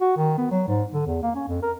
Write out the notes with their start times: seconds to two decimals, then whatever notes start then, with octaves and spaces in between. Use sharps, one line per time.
0.01 F#4
0.17 D#3
0.38 B3
0.51 F#3
0.68 G#2
0.93 D3
1.07 E2
1.23 A#3
1.35 C#4
1.48 F2
1.62 A#4